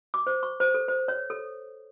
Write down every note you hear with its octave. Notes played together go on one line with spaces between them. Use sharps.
D6
C5
C#6
C5
A4
C5
C#5
A4